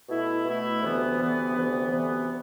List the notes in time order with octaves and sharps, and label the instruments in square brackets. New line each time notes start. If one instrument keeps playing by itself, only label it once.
[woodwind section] B2 A3 E4
B2 A3 E4
D2 C3 E3 B3
D2 C3 E3 B3
D2 C3 E3 B3
D2 C3 E3 B3